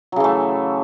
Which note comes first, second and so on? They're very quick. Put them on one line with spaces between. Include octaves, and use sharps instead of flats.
F#3 C#3 E3 A3